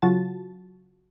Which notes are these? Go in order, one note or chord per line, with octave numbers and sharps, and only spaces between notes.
C#3 F#3 F4 F#4 A5 A6